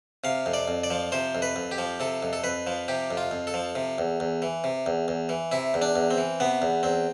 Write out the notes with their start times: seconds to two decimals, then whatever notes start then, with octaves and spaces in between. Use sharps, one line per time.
0.24 C3 F5
0.46 F2
0.54 D5
0.68 F2
0.84 D5
0.91 F3
1.12 C3 C5
1.35 F2
1.42 B4
1.56 F2
1.71 G4
1.78 F3
2.00 C3 A4
2.23 F2
2.33 A4
2.44 F2 B4
2.67 F3
2.88 C3 G4
3.11 F2
3.17 F4
3.31 F2
3.47 A4
3.54 F3
3.75 C3
3.98 E2
4.20 E2
4.42 E3
4.64 C3
4.86 E2
5.08 E2
5.29 E3
5.52 C3 E4
5.74 E2
5.82 D4
5.96 E2
6.11 C4
6.18 E3
6.40 C3 B3
6.62 E2
6.83 E2 C4